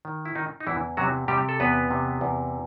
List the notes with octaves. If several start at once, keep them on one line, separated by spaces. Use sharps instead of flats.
D#3
E4
D#3 D#4
D#4
E2 E3 E4
C3 F#3 F#4
C3 G3 G4
A4
E2 B3 B4
C3
E2